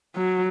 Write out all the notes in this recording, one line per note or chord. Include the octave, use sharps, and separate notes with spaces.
F#3